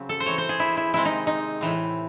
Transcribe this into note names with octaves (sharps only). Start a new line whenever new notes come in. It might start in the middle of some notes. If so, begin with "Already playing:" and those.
Already playing: C#3 F#3 C4
A4
C5
E3 C4 C#5
C5
G#4
E4
E4
C3 D#3 G#3 C4 E4
D#4
D#4
A2 E3 C4